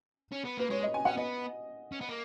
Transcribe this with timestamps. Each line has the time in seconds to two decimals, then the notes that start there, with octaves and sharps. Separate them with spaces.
0.32 C#4
0.45 B3
0.57 A#3 B4
0.70 G#3 C#5
0.83 D#5
0.94 G#5
1.05 C#4 F#5
1.17 B3 D#5
1.92 C#4
2.01 B3
2.09 A#3